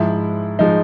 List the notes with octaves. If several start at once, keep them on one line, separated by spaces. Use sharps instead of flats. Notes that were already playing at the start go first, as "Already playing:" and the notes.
Already playing: G#2 F3 G#3 E4
F3 G#3 D#4